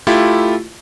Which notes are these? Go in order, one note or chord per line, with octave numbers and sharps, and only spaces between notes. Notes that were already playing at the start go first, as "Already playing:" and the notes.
A3 E4 F4 G4